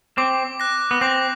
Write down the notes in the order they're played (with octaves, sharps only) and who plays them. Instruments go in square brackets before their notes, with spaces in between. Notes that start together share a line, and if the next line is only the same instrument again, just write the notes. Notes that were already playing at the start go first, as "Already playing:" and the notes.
[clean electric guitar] C4 [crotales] D6
[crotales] F#6 A#6
[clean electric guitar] B3
[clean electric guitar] C4 [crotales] D6